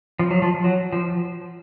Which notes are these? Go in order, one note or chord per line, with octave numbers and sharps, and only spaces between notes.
F3
F#3
F3
F#3
F3